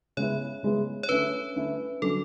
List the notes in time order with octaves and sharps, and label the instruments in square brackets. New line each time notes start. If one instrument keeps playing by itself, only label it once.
[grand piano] C#3 G#3 B3 E4 [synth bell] C#5
[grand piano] C#3 G#3 B3 E4
[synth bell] C#5
[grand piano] D3 A3 C#4 E4 [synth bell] B4
[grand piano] D3 A3 C#4 E4
[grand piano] D3 F#3 C#4 [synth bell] A4